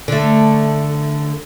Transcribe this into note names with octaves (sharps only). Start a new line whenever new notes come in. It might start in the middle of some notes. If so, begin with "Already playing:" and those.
D3 A3